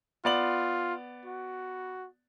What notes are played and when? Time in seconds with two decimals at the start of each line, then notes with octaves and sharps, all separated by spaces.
0.25 B3 F4 D5 F#7
1.25 F#4